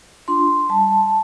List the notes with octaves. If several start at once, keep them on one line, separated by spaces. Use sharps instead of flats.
D4 F4 C6
G3 A5